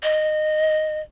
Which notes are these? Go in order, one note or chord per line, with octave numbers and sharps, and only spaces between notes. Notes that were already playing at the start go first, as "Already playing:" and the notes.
D#5